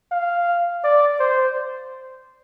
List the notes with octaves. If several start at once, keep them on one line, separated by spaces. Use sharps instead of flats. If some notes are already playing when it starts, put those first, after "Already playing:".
F5
D5
C5